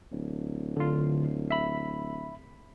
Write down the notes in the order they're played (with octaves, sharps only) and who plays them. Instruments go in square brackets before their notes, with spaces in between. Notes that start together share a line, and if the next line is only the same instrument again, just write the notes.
[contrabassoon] D1
[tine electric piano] D3 F4
E5 B5